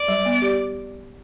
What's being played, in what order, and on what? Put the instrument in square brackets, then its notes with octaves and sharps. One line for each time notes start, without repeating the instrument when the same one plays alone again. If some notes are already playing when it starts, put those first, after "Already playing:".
Already playing: [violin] D5
[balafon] G3
B3
G4